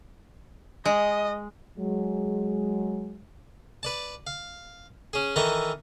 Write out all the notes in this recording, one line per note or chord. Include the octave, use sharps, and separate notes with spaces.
G#3 D#5
F#3 G#3
B4 D5 A5
F5
C#4 G#4
D#3 E3 A4 E5 A#5 C#6